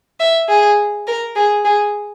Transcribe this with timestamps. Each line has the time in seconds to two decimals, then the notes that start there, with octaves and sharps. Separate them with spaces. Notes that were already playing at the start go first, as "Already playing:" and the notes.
0.20 E5
0.49 G#4
1.07 A#4
1.36 G#4
1.65 G#4